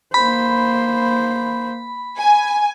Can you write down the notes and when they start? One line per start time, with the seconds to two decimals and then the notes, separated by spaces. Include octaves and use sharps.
0.14 A#3 C5 B5
2.17 G#5